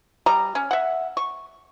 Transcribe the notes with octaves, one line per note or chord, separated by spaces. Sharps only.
G3 D#5 A#5
C#4
E5 F#5
C#6